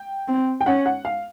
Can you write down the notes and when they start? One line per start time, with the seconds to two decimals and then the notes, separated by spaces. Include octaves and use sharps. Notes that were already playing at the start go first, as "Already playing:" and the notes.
Already playing: G5
0.28 C4
0.61 G5
0.66 C#4 F#5
0.86 F#5
1.05 F5